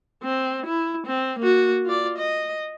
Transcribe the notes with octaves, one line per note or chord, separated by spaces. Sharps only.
C4
E4
C4
A#3 F#4
F4 D5
D#5